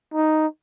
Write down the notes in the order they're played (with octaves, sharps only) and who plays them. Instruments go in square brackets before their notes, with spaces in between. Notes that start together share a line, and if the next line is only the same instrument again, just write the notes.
[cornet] D#4